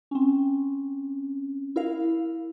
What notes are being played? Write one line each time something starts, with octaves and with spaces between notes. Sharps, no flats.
C4 C#4
E4 A#4 F5